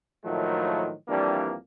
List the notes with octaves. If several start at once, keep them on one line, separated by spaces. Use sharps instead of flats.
A2 D#3 F3 F#3 A3 A#3
F2 E3 G3 A#3 D4